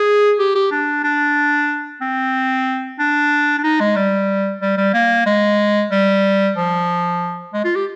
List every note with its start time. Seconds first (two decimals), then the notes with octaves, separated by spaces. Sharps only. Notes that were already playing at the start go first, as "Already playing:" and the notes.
Already playing: G#4
0.39 G4
0.55 G4
0.71 D4
1.04 D4
2.01 C4
2.99 D4
3.58 D4
3.63 D#4
3.80 G#3
3.96 G3
4.61 G3
4.77 G3
4.93 A#3
5.26 G#3
5.91 G3
6.56 F3
7.53 G#3
7.64 F4
7.76 G4